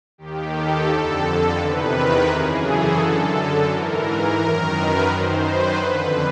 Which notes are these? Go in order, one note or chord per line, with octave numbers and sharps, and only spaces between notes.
D#2 D#3 G4
A4
F2 D3
E2 C3 D#3 B4
A#4
F#2 C#3 E3 G#4
A4
F#2 D3
A4
G#2 E3 A#4
A#4
F#2 D#3 A#4
B4
F#2 D#3 C5
B4
F2 D3 B4